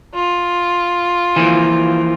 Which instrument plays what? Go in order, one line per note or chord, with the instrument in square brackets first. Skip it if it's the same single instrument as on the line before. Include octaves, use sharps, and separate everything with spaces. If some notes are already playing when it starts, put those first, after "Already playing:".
[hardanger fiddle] F4
[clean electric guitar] E3 F3 A#3